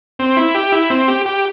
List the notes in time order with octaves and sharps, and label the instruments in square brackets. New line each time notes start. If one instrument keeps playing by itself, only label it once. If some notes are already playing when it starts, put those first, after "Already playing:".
[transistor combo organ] C4
E4
G4
E4
C4
G4
G4